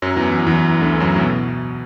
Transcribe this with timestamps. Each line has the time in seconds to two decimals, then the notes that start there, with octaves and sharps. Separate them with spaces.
0.02 F#2 F#3
0.16 E2 E3
0.31 E2 E3
0.46 E2 E3
0.81 D2 D3
1.00 F#2 F#3
1.16 A2
1.21 B2